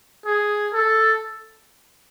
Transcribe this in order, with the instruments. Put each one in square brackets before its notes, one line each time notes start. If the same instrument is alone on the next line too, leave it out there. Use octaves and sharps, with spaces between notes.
[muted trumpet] G#4
A4